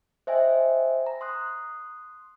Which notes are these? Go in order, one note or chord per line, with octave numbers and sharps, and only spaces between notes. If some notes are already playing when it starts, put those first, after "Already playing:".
C5 D#5 E5 G5 G#5
A#5
C6 D#6 F#6